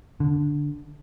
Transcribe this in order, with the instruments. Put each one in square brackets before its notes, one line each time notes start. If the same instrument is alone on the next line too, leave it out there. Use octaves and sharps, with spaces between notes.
[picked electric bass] D3